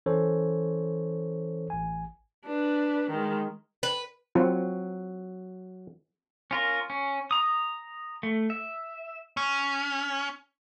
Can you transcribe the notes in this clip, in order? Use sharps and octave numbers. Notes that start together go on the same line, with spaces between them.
E3 C#4 A4 C5 C#5
A1 G#5
D4 B4
D#3 G#3
B4
F#3 C4 F4
C#4 F4 A#4
C#4
A#5 D#6
A3
E5
C#4